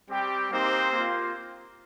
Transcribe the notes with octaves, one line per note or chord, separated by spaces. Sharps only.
G3 C4 G4
A#3 C4 D#4 G4 C5
A#3 F4